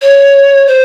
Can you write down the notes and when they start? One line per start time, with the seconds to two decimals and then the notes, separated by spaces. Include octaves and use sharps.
0.02 C#5
0.67 C5